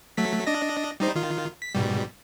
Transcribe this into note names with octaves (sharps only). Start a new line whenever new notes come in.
F#3 A3 B6
D4 D#5 A#6
G3 D#4 C5
D#3 F4
B6
G#2 B2 G3